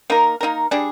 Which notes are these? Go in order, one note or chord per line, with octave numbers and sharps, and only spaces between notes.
A#3 D#4 A#4
A#3 D#4 A#4
G3 D4 G#4